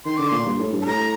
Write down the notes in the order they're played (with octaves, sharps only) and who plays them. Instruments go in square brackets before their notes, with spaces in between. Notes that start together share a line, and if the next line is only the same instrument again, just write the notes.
[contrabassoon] D#3 [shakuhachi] C6
[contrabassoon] D3 [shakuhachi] D6
[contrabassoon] A#2 [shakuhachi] C6
[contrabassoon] G2
A2
G2
[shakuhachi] A5
[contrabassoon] A2 [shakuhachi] A#5